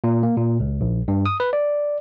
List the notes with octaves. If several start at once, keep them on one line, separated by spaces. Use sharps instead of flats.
A#2
A#3
A#2
C#2
A#1
G2
D#6
B4
D5